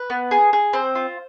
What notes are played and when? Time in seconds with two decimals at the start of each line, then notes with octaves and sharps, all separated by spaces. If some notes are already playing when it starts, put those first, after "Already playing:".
Already playing: B4
0.10 B3
0.31 G#4
0.53 G#4
0.73 C4 C5
0.95 F4